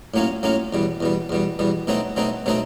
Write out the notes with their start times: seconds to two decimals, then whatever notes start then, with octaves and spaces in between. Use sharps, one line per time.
0.14 A2 F#3 A#3 C#4 F4
0.43 A2 F#3 A#3 C#4 F4
0.73 E2 B2 G3
1.00 E2 B2 G3
1.29 E2 B2 G3
1.59 E2 B2 G3
1.87 B2 F#3 A3 C4 D#4
2.16 B2 F#3 A3 C4 D#4
2.46 B2 F#3 A3 C4 D#4